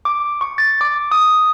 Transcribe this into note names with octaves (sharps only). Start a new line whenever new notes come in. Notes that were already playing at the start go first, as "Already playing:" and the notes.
D6
C#6
A6
D6
D#6